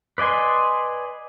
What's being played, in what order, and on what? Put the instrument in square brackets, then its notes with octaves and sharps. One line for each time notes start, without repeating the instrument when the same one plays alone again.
[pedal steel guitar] B4 D5 D#5 G#5 C6